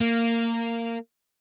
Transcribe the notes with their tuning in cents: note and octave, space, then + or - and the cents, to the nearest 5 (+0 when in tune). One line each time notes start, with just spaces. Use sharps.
A#3 -15